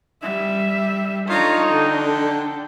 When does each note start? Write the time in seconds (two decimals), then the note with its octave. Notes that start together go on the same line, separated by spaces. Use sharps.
0.23 G3 E5
1.29 D4 D#4 F4 A4 C#5 A#5
1.72 D3 G5